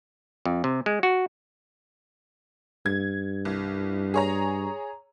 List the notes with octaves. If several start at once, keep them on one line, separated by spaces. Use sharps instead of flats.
F2
C3
G#3
F#4
G2 G#6
C2
G#4 C#5 A#5